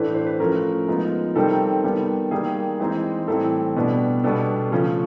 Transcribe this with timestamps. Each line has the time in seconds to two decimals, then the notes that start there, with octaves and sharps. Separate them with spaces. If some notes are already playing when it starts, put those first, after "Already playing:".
Already playing: A2 E3 A3 D4 B4
0.15 C5
0.27 B4
0.40 F3 A3 C#4 A#4
0.88 F3 G#3 B3 D#4
1.36 C3 D#3 G3 C4 A4
1.84 D#3 G3 B3
2.31 D#3 G3 A#3 G#4
2.80 E3 G#3 C4 D#4
3.27 A2 E3 G3 C4 A4
3.76 B2 G3 B3 D4
4.24 B2 G3 B3 D4 A4
4.72 C#3 F3 A3 C#4